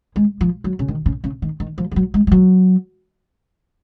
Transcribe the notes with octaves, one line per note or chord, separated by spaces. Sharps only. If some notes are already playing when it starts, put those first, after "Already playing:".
G#3
F3
F#3
C#3
D#3
C#3
C#3
D#3
D#3
F3
G#3
F#3
G#3
G#3
F#3